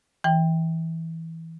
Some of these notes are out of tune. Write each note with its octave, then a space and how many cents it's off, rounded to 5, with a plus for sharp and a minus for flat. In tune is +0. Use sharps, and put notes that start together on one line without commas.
E3 -15 G5 +10